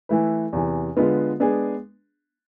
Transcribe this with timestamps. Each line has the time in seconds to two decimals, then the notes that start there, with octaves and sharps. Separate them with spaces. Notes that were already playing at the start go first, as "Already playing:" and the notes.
0.09 E3 A3 E4 B4
0.53 E2 C3 E3
0.96 D3 G#3 B3 F4 B4
1.40 G#3 B3 D4 G#4